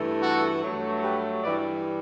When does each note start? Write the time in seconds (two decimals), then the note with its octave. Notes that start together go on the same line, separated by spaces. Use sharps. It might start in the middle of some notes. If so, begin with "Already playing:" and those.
Already playing: G2 E3 A3
0.20 F#4 A4
0.61 G2 F#3 A3
1.02 G4 B4
1.43 G2 E3 G3 B4 D5